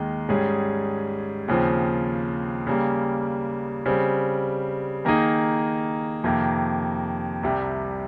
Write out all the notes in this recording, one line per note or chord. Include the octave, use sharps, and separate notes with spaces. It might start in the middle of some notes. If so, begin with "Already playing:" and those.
Already playing: D#2 D#3 G#3
G#2 G3 C#4 G#4
D#2 C#3 F3 C4
C#3 G3 A#3
C#3 G3 C4
D#3 A#3 D#4 G#4
F2 C3 D#3 A#3
C2 C3 G3